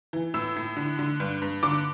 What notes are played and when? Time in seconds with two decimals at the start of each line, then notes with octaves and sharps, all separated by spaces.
0.13 E3
0.34 A2 E6
0.56 A2
0.77 D3
0.99 D3
1.20 G2
1.42 G2
1.63 D3 D6